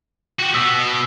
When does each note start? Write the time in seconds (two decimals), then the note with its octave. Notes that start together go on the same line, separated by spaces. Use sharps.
0.39 F#4 G4
0.54 B2 B3 E6